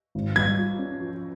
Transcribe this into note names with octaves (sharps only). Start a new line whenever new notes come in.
G#1
G3 G#6
F4
C#4
F3